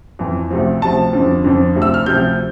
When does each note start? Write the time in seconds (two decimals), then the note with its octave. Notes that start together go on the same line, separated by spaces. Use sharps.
0.19 F2 E3
0.50 D2 C3 F3
0.82 D2 C3 F3 A5
1.13 F2 D3 F3
1.44 F2 D3 F3
1.75 D2 C3 F3
1.82 E6
1.94 F6
2.06 D2 C3 F3 G6